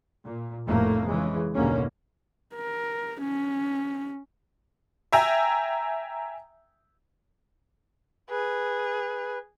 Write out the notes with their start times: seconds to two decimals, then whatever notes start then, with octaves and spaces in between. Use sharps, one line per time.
0.24 A#2
0.67 F1 F2 A2 A3 A#3
1.08 C#3 E3 G#3
1.55 F#1 D#2 B2 D3 A#3 C#4
2.55 A#4
3.22 C#4
5.13 E5 G5 G#5 A#5
8.30 G#4 B4